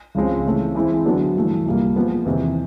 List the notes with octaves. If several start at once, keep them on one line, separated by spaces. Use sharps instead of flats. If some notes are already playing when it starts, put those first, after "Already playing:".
C#2 C#3 F3 G#3 C4
C#3 E3 A3 C4
E3 G#3 C4 E4
D3 F#3 B3 D4
G2 E3 A3
C2 A#2 G3 A#3
A#2 F3 G#3 B3
E2 C3 D#3